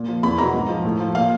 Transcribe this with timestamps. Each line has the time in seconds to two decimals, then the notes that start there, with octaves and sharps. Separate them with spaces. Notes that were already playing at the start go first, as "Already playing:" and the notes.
Already playing: A#2
0.08 F3
0.23 E2 B5
0.38 B2 F#3 A#5
0.54 G#2
0.69 F3
0.84 A2
1.00 F3
1.15 A#2 F5